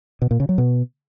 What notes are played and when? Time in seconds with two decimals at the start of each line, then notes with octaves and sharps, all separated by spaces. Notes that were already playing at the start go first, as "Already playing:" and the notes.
0.22 B2
0.31 A#2
0.40 C#3
0.49 F#3
0.58 B2